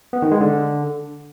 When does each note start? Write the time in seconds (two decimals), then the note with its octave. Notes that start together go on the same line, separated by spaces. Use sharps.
0.13 B3
0.22 D#3
0.31 G#3
0.41 D3